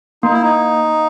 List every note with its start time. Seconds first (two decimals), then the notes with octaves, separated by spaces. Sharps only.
0.23 A#3 D#4
0.33 E4
0.42 D#4